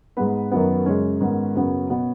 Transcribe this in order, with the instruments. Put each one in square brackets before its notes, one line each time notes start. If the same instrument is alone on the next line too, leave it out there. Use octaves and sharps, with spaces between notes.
[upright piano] G#2 G#3 B3 B4
F#2 D#3 F#3 B3
F#2 C#3 G#3 C#4
G#2 D#3 B3
F#2 C#3 F#3 B3
B2 B3